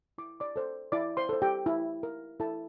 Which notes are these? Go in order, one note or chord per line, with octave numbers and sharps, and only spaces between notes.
E4 D6
D5 D6
A4 C5
E4 D5 D6
C5 C6
A4 C5
G4 G5
E4
A#4
E4 A4 A5